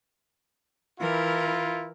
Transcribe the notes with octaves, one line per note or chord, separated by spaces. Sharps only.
E3 E4 F4 A#4